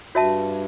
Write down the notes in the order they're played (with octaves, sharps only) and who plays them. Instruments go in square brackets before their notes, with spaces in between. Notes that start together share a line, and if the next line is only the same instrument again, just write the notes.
[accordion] G2 [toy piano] F#4 C#5 E5 A5